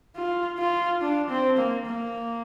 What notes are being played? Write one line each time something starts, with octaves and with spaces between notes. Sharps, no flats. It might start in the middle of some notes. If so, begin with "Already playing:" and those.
F4
F4
D4
C4
A#3
A#3